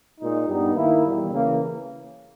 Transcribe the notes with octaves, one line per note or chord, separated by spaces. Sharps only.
A#2 G#3 D#4
G2 G3 B3 D#4
D#3 A#3 E4
E2 B2 G3
C#3 E3 A#3